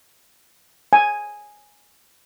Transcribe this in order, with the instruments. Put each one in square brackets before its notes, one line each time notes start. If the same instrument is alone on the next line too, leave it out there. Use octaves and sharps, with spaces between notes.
[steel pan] G#5